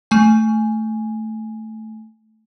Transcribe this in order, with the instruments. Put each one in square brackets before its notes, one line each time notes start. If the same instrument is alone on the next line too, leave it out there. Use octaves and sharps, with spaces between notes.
[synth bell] A3 G#5